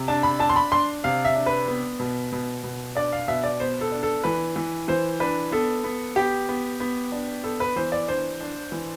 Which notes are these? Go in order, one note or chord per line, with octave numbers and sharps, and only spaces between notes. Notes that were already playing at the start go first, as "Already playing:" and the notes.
Already playing: C3
D4 A5
B5
D4 A5
C6
B5
D4 C6
C3 F5
E5
D4
B4
B3
B2
B2
B2
D4 D5
F5
B2 E5
D5
B3 C5
A4
D4
A4
E3 B4
E3
E3 C5
D4 B4
B3 A4
B3
B3 G4
B3
B3
D4
B3 A4
B4
E3 C5
D5
D4 C5
D4
E3